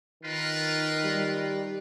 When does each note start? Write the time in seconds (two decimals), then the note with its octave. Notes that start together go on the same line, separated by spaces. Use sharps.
0.23 D#3 F4 A#4 B4
1.04 G3